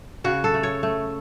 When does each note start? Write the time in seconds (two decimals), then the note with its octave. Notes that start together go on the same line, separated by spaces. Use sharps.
0.24 C#3 F#4
0.44 A4
0.54 A3
0.63 C#5
0.83 A3